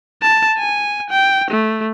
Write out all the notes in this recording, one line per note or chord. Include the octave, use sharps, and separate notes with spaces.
A5
G#5
G5
A3